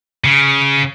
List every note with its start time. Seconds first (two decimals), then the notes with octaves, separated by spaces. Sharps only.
0.25 C#3